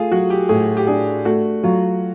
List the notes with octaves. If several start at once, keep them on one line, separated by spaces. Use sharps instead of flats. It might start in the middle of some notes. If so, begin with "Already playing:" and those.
Already playing: A3 F4 G#4
F#3 F#4
G4
A2 G#4
G4
D4 G#4
A3 F#4
F#3 F4